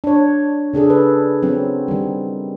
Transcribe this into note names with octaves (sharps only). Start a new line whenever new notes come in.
D4 C#5
C#3 D4 G#4 A4
B4
F#3 C4 C#4
D#3 G3